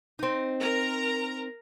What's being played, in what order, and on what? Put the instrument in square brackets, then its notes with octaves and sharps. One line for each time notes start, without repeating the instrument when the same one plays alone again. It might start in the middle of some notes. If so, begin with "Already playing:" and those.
[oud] C4 D#4
[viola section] A#4 A#5